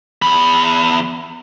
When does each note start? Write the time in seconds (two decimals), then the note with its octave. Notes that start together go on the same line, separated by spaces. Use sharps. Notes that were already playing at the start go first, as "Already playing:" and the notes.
0.22 E2 B5